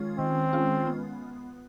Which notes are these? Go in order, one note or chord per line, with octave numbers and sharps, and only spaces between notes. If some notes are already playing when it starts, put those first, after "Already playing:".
Already playing: D#3 G#3 C#4 F4
D#3 C4
G#3 C#4 F4
B3